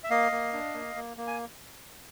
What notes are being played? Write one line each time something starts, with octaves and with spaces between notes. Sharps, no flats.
E5
A#3 D#5 F5
A#3
D4
A#3
A#3
A#3
G#5